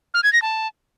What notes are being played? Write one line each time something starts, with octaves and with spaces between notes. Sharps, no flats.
F6
G#6
A#6
A5